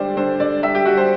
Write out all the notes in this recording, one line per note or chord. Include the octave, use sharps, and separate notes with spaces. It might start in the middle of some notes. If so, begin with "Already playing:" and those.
Already playing: D3 G3 C5 D5
D3 C5
D3 D5
G3 E5
G4
G3 F#4
C5